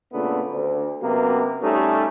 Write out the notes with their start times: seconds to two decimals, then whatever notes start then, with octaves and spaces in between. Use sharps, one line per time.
0.13 A#2 C#3 A3 B3 D4
0.51 D2
1.02 F#2 C3 A#3 B3
1.62 G3 A3 C#4 D#4 A4